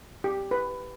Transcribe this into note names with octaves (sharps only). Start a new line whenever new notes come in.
G4
B4